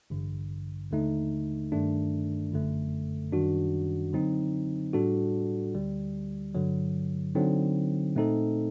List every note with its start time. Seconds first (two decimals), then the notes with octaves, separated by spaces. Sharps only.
0.10 A1 G2 D3
0.91 D#2 D3 A3 D#4
1.72 G2 D#3 A3 D4
2.52 G1 F#2 D3 A3
3.32 F#2 D#3 G3 D4 F#4
4.13 D3 F#3 C4 D#4
4.93 A2 G3 D4 F#4 A4
5.74 D2 D3 G3
6.55 G2 D3 F#3
7.35 D3 F#3 C4 D#4
8.15 A#2 A3 C4 D#4 A4